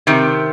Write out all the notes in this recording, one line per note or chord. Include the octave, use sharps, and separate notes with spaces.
C3 D#3